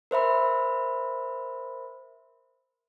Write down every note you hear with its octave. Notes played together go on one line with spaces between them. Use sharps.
A#4 C5 E5 B5